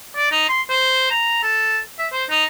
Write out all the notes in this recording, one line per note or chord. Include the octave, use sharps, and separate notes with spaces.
D5
D#4
C6
C5
A#5
A4
E5
C5
D#4